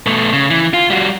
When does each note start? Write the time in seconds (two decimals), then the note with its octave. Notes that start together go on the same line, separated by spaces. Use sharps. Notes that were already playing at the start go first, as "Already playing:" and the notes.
0.06 B2 A3
0.33 C#3
0.50 E3
0.73 F4
0.90 G3 F#4